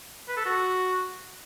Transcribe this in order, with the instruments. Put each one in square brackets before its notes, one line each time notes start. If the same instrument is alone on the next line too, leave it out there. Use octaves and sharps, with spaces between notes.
[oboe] B4
A4
F#4